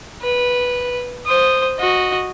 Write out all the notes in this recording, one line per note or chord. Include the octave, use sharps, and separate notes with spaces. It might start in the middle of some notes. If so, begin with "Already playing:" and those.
B4
C5 D#6
F#4 D#5